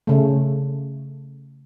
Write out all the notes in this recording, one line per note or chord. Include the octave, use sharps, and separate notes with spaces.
C#3 A3